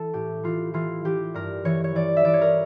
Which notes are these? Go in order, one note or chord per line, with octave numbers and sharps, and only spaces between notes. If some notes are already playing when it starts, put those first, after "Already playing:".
Already playing: E3 A4
A2 G4
E3 F4
E3 F4
E3 G4
G2 A#4
E3 C#5
C#5
E3 D5
E5
E3 D5
C#5
A#4